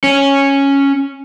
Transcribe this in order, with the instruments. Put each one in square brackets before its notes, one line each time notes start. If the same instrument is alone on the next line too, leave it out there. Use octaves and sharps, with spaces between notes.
[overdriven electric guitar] C#4